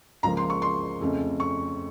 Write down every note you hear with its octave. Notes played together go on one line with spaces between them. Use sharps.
C#2 C#3 F3 A#3 A#5
C6
C#6
C6
F2 C#3 A3 C#4
C#6